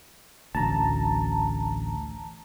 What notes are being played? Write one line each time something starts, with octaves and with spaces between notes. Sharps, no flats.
A1 D2 A5 A#5